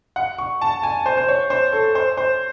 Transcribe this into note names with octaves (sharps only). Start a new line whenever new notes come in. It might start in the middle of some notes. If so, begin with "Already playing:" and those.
F#5
C#6
A5
G#5
C5
C5
C#5
C5
A4
C5
C5